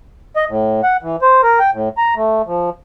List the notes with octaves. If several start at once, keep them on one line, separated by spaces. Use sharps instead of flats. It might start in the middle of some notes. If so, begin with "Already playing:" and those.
D#5
A2
F#5
E3
C5
A#4
G5
A2
A#5
A3
F3